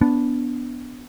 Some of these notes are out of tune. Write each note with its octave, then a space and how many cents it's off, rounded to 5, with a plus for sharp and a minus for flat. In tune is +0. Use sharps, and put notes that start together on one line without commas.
B3 +0 D4 -15